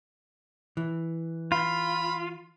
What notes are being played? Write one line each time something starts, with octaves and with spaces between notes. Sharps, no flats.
E3
F4 B5